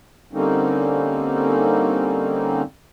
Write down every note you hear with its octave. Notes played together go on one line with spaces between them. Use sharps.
D3 G3 A#3 C4 C#4 D#4